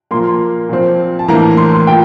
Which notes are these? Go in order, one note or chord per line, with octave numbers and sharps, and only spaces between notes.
A#2 F3 A#3 C6
A#2 F3 C4
A5
A2 E3 A#3 D4 A#5
C6
A#2 G5